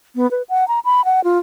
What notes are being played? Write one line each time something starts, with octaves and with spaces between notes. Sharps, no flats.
B3
B4
F#5
A#5
B5
F#5
F4